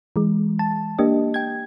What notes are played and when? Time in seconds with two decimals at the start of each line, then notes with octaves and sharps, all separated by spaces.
0.16 E3 G#3
0.59 A5
0.99 A#3 D4 G4 D#5
1.34 G5 G#6